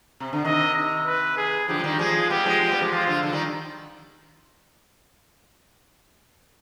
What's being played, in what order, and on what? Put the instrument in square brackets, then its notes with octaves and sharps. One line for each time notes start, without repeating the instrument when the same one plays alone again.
[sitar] C3
D3
[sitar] C3 D#3 [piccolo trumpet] D#5
[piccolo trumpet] B4
G#4
[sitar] D3 F3 [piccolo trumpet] G4
[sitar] G#3
D#3 G3
[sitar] F3 G#3 [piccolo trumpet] G#4
[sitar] G3 B3 [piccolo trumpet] G4
[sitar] F3 G#3
F3 G#3
G3 B3
F3 G#3
[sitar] F3 G#3 [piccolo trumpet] F4
[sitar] D3 F3
D3 F3
D#3 G3